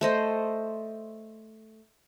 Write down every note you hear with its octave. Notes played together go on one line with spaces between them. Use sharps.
A3 C5 D#5